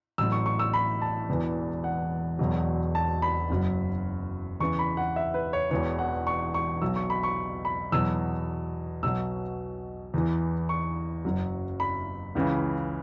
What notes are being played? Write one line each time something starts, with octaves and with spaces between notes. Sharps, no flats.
A1 A2 F#3 E6
C#6
C#6
E6
B5
A5
E1 E2 E3
F#5
E1 E2 B2 F#3
A5
B5
F#1 F#2 F#3
E2 C#3 E3 C#6
B5
F#5
E5
B4
C#5
E1 E2 E3 C#5
F#5
C#6
C#6
B1 B2 F#3 E6
C#6
B5
C#6
B5
E2 B2 F#3 E6
B1 B2 F#3 E6
E2 E3
C#6
F#1 F#2 F#3
B5
C#2 C#3 E3